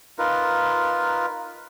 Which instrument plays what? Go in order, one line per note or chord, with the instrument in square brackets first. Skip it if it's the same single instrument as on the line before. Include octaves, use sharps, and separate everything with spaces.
[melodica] D#4 F4 A#4 B4